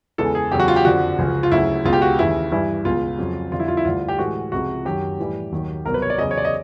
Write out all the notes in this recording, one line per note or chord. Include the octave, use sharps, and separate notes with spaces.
E2 C#3 E3 G#3 A4
G#4
E2 C#3 F#3 G4
F#4
F4
G4
F2 D3 F3 F#4
C#2 C#3 F3
F4
D2 C#3 F#3 E4
C#2 B2 G#3 F4
G4
F#4
D#2 C#3 E3 E4
G2 E3 G3 E4
C#2 B2 G#3 F4
F2 C#3 F#3
F2 D3 G3 F4
E4
F4
E4
D2 D3 G3 F4
G4
A2 E3 G#3 F#4
C#2 C3 F3 G#3 F#4
F#2 D#3 F#3 G4
A2 E3 G3
D#2 D#3 F#3
C2 B2 F#3 A#4
B4
C#5
D5
E2 C#3 F#3 D#5
C#5
D5
D#5